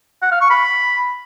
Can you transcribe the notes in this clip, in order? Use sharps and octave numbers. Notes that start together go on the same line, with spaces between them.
F#5
F5
C#6
B5